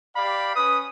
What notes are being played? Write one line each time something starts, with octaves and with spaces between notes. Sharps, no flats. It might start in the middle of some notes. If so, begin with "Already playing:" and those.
G4 D5 F5 B5
C#4 B4 D#6